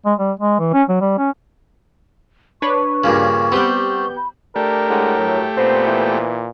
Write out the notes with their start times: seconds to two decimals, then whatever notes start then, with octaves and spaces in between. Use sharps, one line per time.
0.05 G#3
0.19 G3
0.40 G#3
0.59 E3
0.74 C#4
0.89 F#3
1.01 G3
1.18 C#4
2.62 D4 B4 C#5 C#6
3.04 G2 A#2 C#3
3.52 G3 B3 C4 G4 G6
4.17 B5
4.56 A3 D4 G4 A#4
4.89 A2 G#3 D4 F#5
5.18 G2 F#3
5.57 A#2 B3 C4 C5
5.87 E3